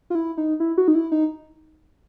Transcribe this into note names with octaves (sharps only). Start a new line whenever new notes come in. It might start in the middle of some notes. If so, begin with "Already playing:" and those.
F4
E4
D#4
E4
F#4
D#4
E4
D#4